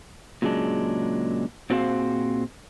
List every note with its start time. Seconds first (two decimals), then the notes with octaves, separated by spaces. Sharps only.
0.42 A#2 C#3 F#3 G#3 D4
1.70 A#2 C4 F#4 G#4 C5 F5